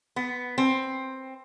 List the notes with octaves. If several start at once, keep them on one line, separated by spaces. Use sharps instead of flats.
B3
C4